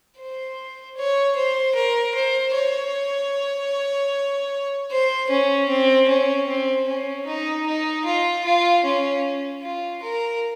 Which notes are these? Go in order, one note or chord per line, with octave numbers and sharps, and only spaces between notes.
C5
C#5
C5
A#4
C5
C#5
C5
C#4
C4
C#4
C4
C#4
D#4
D#4
F4
F4
C#4
F4
A#4